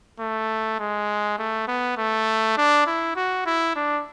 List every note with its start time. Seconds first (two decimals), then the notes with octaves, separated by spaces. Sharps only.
0.20 A3
0.79 G#3
1.39 A3
1.68 B3
1.97 A3
2.57 D4
2.87 E4
3.16 F#4
3.46 E4
3.76 D4